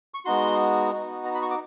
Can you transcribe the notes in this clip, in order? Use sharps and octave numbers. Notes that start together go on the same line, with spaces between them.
C#6
G#3 B3 D#4 F#4 C6
B3 D#4 F#4
A#5
B5
C#6
D6